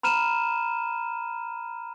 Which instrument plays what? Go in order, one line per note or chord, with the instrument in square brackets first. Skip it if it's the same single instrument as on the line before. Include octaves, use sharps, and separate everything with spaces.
[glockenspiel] A#5 B5 F6 D#7 E7